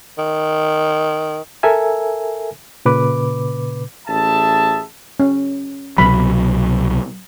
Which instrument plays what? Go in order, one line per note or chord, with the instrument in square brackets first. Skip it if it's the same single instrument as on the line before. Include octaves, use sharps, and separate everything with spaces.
[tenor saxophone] D#3
[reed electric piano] A4 A#4 E5 G#5
A#2 C#3 B4 D6
[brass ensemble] A1 G#4 E5 A5
[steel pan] C#4
[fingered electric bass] C2 B2 F#3 [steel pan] B5